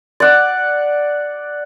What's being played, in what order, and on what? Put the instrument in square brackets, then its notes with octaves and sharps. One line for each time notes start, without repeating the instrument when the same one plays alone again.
[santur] D5 F#5